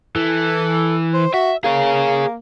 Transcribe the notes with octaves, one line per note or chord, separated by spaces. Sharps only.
E3 A4
C5
F#4 E5
A#3 G#4 C#5